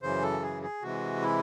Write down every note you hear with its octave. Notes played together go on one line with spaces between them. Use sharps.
F#2 C#3 E3 C5
A4
G#4
G#4
C3 E3 G#3 F#4
E4